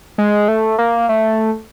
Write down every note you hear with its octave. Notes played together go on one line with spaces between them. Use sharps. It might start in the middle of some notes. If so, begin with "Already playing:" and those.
G#3
A3
A#3
A3